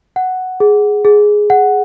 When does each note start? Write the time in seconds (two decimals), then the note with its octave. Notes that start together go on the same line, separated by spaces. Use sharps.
0.16 F#5
0.60 G#4
1.05 G#4
1.50 F#5